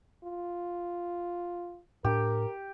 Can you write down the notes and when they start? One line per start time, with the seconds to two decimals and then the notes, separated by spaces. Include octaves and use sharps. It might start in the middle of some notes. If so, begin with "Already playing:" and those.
0.24 F4
2.04 A2 D4 G4 A#4